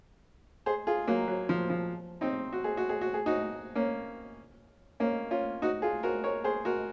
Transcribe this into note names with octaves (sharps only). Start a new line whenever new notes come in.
G#4 C5
F4 G#4
F#3 A#3
F#3
F3
F3
C4 D#4
F#4
G#4
F#4
G#4
F#4
G#4
D#4 F#4
A#3 C#4
A#3 C#4
C#4 F4
D#4 F#4
F4 G#4
F#4 A#4
A#4 C#5
G#4 C5
F#4 A#4